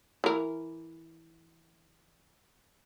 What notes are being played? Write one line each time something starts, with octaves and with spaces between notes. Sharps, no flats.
E3 A#4